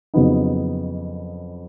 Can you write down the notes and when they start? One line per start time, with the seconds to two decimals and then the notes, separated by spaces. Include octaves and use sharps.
0.14 F2 C#3 F#3 B3 D#4